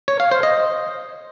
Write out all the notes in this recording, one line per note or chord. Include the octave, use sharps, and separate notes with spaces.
C#5
F5
C5
D#5